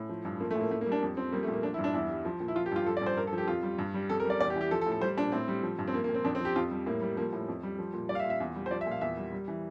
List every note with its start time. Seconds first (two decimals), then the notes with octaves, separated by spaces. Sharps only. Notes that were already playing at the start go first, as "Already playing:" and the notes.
Already playing: A2
0.09 F3
0.25 G2
0.40 F3 A#3
0.51 A3
0.56 A2 A#3
0.71 A2 A3
0.81 A#3
0.86 G3
0.92 D4
1.02 F2
1.17 F3 C4
1.32 G3 A#3
1.43 A3
1.48 A#2
1.53 A#3
1.63 F3 D4
1.74 E4
1.79 G2
1.84 D4
1.94 E2 E4
2.09 G3
2.25 F3
2.40 A#2
2.48 E4
2.55 F3 F4
2.66 G4
2.71 G2 F4
2.86 F3 A4
2.97 D5
3.02 G2 C5
3.17 G2 A#4
3.27 A4
3.33 F3
3.38 G4
3.48 F2 F4
3.63 G3
3.79 G2
3.94 G3
4.10 F2 A4
4.20 A#4
4.25 G3
4.30 D5
4.40 E2 D5
4.50 G4
4.56 E3
4.61 G4
4.71 F3 A4
4.81 A4
4.86 A2
4.92 A4
5.01 G3 C5
5.17 A#2 D4
5.32 A2 C4
5.48 G3
5.63 F3
5.79 G2
5.88 C4
5.94 F3 A#3
6.04 A#3
6.09 A#2
6.14 C4
6.24 F2 D4
6.35 C4
6.40 F3 G4
6.56 F2 F4
6.71 G3
6.86 A2 A#3
7.02 G3
7.17 F3 A#3
7.33 A2
7.48 F2
7.63 G3
7.79 F3
7.93 A#2
8.09 G3 D5
8.15 F5
8.20 E5
8.25 A#2
8.30 E5
8.40 E2
8.55 G3
8.66 C5
8.71 F3 D5
8.81 E5
8.86 A#2
8.91 F5
9.01 E2 E5
9.17 G3
9.32 G3
9.48 E3